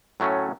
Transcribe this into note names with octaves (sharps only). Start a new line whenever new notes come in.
A2 F#3 A3 C#4